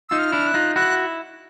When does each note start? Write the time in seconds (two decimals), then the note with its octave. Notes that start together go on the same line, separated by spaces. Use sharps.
0.10 D#4 F4 E6
0.19 F6
0.32 D4 E4
0.48 F#6
0.54 D#4 F4
0.76 E4 F#4 F#6